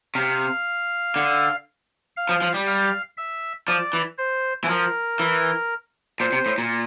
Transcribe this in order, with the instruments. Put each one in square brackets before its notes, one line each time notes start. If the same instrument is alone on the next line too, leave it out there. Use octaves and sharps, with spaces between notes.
[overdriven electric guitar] C3 [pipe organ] F5
[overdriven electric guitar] D3
[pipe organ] F5
[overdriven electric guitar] F3
F3
G3
[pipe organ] F5
E5
[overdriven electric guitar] F3 [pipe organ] D5
[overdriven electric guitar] E3
[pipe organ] C5
[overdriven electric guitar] E3
[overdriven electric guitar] F3 [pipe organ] A#4
[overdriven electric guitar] E3
[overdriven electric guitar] A#2 [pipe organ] C5
[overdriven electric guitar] C3
A2
A#2